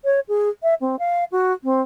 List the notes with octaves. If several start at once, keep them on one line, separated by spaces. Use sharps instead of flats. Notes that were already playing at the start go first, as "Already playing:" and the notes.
C#5
G#4
E5
C4
F5
F#4
C4